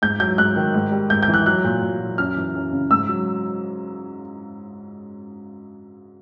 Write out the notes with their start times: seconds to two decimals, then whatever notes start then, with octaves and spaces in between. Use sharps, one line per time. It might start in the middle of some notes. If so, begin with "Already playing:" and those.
0.02 G#2 G6
0.20 F#3 G6
0.38 G#2 F#6
0.56 D#3
0.74 G#2
0.92 G3
1.10 G#2 G6
1.23 G6
1.28 E3
1.34 F#6
1.46 F#3 F#6
1.64 A#2
1.82 A#2
2.00 F#3
2.18 F#2 F6
2.36 E3
2.55 F#2
2.72 C#3
2.91 G#2 E6
3.09 F#3